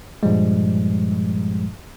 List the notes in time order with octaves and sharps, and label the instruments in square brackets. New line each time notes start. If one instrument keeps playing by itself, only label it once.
[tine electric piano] G2 A#2 F3 G3 G#3